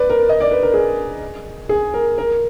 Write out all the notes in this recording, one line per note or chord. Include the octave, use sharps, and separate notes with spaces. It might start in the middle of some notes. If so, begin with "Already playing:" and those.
Already playing: B4 D5
A#4
D#5
D5
B4
A#4
G#4
G#4
A#4
A#4